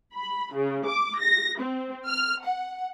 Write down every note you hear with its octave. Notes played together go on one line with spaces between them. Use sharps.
B5
C#3
D6
A#6
C4
F6
F#5